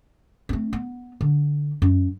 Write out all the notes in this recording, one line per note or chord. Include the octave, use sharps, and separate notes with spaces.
A3 C4
B3
D3
F#2